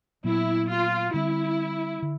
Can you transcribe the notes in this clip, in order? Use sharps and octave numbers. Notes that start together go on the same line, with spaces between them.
A#2 F#3 B3 E4
F4
D3 G3 C4 E4
D3